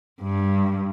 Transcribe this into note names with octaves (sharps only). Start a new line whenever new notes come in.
G2